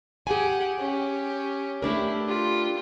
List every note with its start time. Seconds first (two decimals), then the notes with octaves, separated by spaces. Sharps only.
0.27 G4 G#4 F#5 G#5
0.80 C#4 G4
1.82 A3 D4 E4 G4 A#4
2.26 F4 G4